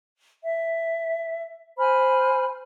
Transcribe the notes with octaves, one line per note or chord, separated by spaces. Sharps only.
E5
C5 G#5 B5 F6